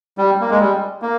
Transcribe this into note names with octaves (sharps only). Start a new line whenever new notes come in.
G3
A#3
G#3
G3
A#3